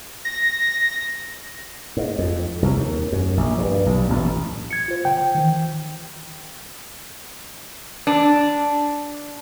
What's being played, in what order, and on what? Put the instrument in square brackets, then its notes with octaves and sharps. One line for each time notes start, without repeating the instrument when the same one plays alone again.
[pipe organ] A#6
[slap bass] G#2
F2
C2
D#2
F#2
A#1
G2
B1
A1
[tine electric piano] G#6 C#7
F4 C5
[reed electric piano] G5
[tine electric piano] D#3 E3
[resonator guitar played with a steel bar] D4